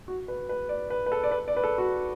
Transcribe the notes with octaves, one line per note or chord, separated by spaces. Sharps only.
F#4
B4
B4
D5
B4
B4
A4
D5
B4
D5
B4
A4
F#4